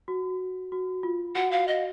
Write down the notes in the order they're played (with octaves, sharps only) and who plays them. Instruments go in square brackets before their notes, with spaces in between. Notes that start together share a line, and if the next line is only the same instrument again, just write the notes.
[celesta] F#4
F#4
F4
[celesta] F#4 [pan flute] F#5
[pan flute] F5
D#5